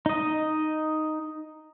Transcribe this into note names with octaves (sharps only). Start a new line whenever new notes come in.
D#4 D#5